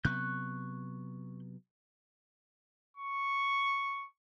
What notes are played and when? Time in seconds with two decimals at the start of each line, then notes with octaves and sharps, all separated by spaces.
0.05 C3 F#3 B3 C#6 F#6 G6
2.97 C#6